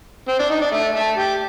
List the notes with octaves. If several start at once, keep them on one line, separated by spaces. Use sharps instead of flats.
C4
D4
D#4
D4
A3
A3
G4